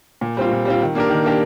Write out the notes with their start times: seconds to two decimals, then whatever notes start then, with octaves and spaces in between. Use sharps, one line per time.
0.21 A#2
0.37 G3 C4 F4
0.52 A#2
0.65 G3 C4 F4
0.81 D#3
0.95 A#3 D4 G4 A#4
1.10 D#3
1.24 A#3 D4 G4 A#4